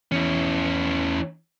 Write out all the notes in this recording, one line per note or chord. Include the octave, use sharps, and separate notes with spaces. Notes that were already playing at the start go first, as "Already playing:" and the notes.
E2 C#4 E4